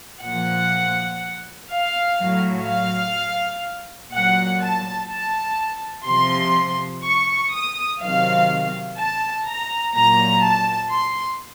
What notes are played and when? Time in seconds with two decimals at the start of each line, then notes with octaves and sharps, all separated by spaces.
0.24 A#2 F3 F#5
1.70 F5
2.18 A2 F#3
2.67 F5
4.13 A#2 F#3 F#5
4.61 A5
5.10 A5
6.06 C3 F3 C6
7.04 C#6
7.52 D#6
8.00 C3 D#3 F#3 F5
8.97 A5
9.46 A#5
9.95 A#2 F#3 A#5
10.43 A5
10.92 C6